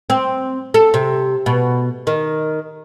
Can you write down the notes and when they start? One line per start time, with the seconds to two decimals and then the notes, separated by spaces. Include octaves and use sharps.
0.10 C4
0.74 A4
0.94 C3
1.46 B2
2.07 D#3